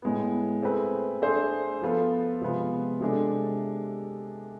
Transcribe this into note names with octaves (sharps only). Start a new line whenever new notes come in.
A2 G#3 B3
A3 C4 G#4 B4
A3 D4 G#4 C5
F3 B3 F4 A4
C3 F3 G#3 B3 F4
C3 G#3 D4 A4